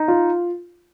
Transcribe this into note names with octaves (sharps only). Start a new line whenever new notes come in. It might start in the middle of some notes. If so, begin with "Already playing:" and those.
Already playing: D#4
F4